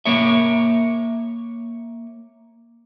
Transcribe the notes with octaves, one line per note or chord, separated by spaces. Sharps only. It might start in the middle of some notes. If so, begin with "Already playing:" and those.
A#3 C#5 E5